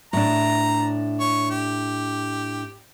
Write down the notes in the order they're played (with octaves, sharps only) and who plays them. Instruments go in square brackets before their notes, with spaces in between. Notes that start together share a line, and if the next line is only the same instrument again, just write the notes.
[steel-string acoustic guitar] A2 D4 [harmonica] A#5
[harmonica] C#5
G4